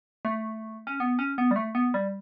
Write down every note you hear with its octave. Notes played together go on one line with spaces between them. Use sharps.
A3
C#4
B3
C#4
B3
G3
A3
B3
G3